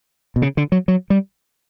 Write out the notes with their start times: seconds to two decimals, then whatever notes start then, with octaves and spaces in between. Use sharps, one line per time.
0.36 B2
0.42 C#3
0.57 D3
0.72 F#3
0.88 F#3
1.10 G3